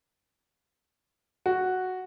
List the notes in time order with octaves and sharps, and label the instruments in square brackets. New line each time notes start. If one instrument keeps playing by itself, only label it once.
[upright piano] F#4